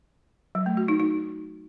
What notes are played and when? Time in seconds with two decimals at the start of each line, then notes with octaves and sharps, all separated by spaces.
0.55 F#3
0.66 A3
0.77 F#4
0.88 D#4
1.00 D#4